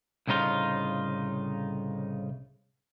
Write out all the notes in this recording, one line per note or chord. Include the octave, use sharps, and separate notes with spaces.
C2 A2 C#3 D#4 F4